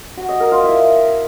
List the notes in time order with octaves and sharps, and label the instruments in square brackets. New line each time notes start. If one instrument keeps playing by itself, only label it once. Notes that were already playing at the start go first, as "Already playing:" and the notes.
[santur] F#4
D#5
A#4
F4
E4